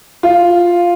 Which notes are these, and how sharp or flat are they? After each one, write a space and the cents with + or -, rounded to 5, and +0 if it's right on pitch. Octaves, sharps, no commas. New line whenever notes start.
F4 +0